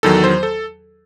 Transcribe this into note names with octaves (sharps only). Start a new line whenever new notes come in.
E2 D#3 F#3 A4
C5
A4